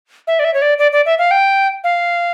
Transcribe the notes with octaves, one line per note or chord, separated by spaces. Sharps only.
E5
D5
E5
C#5
D5
D5
D5
E5
F5
G5
F5